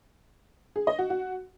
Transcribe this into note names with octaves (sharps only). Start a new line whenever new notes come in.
G#4
D#5
F#4
F#4